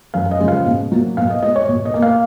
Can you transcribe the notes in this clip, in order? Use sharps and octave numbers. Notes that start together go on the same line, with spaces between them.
F#2 F5
D#5
C#3 F3 G#3
F5
B2
F#3 A#3
B2 F5
D#5
G#3 D#5
C#5
B2
D#5
A#3
F5